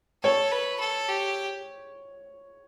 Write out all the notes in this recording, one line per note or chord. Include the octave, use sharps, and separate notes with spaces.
A4 C#5
B4
A4
G4